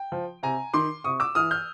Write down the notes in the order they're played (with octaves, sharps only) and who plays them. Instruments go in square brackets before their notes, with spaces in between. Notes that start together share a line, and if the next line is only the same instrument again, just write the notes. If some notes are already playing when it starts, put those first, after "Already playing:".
Already playing: [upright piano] G5
F3
C3 G#5 A#5
D#3 C6 D6
C3 C#6 D#6
D6 E6
E3 D#6 F6
F6 G6